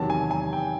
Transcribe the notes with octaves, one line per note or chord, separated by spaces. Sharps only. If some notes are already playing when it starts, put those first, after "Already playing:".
Already playing: E2 C3 D#3 F#3 A5
G#5
G#5
G5